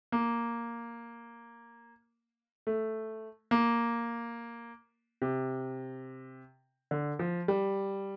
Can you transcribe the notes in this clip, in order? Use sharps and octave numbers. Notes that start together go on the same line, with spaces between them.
A#3
A3
A#3
C3
D3
F3
G3